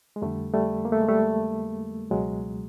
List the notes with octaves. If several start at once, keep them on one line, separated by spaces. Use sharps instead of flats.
G#3
F2 D3 G3 A3
G3 A3
A#3
A3
G#3
G3 A3
C#2 B2 F#3 G#3